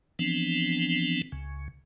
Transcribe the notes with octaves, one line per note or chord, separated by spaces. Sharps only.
E3 F3 B3 C4 D4
C#2 C#3